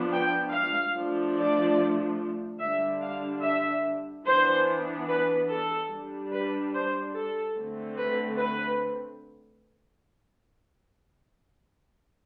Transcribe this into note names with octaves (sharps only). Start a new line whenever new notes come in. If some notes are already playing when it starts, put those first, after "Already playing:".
Already playing: F3 B3 D4
G5
F5
F3 A3 D4
D5
D3 G3 D4 E5
F5
E5
E3 B3 D4 C5
B4
A4
G3 D4
B4
C5
A4
D3 A3 C4
B4
B4